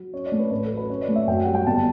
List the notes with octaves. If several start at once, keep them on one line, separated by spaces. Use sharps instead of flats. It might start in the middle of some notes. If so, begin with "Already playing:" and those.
Already playing: F#3
C#4 C#5
D5
A3
B4
A1 B4
A4
F#3
B4
C#4 C#5
D5
A3
E5
F#2 G5
G3 F#5
G5
G1 A5